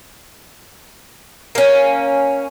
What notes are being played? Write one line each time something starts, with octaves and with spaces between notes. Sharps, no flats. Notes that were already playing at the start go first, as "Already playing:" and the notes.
A#3 C#4